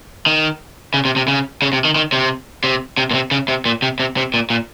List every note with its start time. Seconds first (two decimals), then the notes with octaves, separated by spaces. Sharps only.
0.26 D#3
0.94 C#3
1.05 C3
1.16 C3
1.28 C#3
1.62 C#3
1.73 C3
1.85 D#3
1.96 D#3
2.13 C3
2.64 C3
2.98 C3
3.11 A#2
3.14 C3
3.31 C#3
3.48 C3
3.66 A#2
3.82 C3
4.00 C3
4.17 C3
4.34 A#2
4.50 A#2